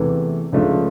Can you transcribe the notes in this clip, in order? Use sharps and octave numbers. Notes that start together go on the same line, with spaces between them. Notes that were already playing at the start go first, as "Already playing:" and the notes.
Already playing: E2 C3 E3 A3
C#2 C#3 F3 A3 D4